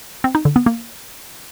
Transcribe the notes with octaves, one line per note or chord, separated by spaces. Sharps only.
C4
D#4
D3
B3
A#3